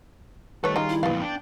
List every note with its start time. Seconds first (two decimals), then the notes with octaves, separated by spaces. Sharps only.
0.64 D#3 G3 A3 A4 B4 C#5
0.76 C#3 D#4 F4
0.89 E4
1.03 F2 A#2 B3 F5
1.22 D4 G5